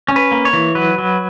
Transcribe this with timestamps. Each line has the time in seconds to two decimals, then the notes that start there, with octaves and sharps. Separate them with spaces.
0.08 C#4
0.16 B4
0.32 A#3
0.45 C#5
0.53 E3
0.75 F#3 B4
0.98 F#3